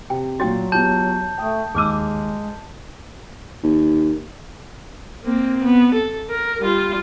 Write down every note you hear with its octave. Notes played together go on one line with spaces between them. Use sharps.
C3 G5
A#2 F#3 F#4 C#5 G5 C6 A6
B3 F4 G4 A5 G6
A3 G5 D#6
D#2 G#3 G#4 D6 E6 F6 D#7
D#2
A#3 C4
B3
A4
A#4
G3 F4